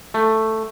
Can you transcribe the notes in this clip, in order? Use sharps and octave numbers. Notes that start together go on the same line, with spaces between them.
A3